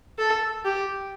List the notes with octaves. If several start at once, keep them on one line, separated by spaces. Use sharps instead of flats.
A4
G4